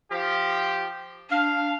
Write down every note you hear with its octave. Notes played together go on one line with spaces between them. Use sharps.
F3 G4
D4 F5